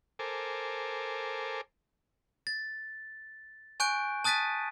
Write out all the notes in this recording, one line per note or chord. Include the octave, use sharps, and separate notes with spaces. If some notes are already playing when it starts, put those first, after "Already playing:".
A4 A#4 C5 G#5 D6
A6
G#5 C#6 F#6 G6 D7
A5 D#6 F#6 A6 B6 D#7